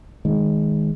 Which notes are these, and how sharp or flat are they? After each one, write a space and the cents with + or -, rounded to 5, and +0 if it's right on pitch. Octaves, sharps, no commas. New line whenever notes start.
D#3 +0 G#3 +0